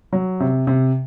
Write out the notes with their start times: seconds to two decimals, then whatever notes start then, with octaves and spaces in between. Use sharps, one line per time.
0.13 F#3
0.40 C3
0.67 C3